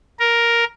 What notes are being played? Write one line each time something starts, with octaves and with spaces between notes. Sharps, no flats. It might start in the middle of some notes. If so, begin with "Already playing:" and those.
A#4